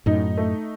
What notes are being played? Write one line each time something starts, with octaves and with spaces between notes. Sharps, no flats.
F#2 A2 D#4
A3